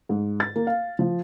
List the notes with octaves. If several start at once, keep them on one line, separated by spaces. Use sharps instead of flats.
G#2
A6
A#3
F5
F3